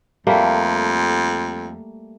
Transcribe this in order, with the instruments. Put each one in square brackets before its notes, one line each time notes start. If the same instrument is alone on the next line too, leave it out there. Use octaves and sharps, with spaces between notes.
[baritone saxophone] F2 [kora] G3 A3 A#3